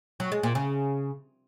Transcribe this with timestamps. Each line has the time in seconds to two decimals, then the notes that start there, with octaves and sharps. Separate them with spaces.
0.20 F#3
0.32 G#3
0.43 A#2
0.55 C#3